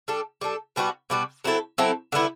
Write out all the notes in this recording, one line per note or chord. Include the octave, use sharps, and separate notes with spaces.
G3 D4 A4
G3 D4 A4
B2 G3 B3 F#4
B2 G3 B3 F#4
F#3 C4 E4 A4
F#3 C4 E4 A4
D3 G3 B3 E4